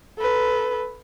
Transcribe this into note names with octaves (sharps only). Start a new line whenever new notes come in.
A4 B4